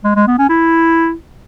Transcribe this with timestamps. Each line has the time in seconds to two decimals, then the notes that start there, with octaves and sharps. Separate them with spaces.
0.04 G#3
0.15 G#3
0.27 B3
0.39 C#4
0.49 E4